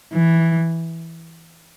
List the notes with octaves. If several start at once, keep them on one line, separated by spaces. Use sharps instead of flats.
E3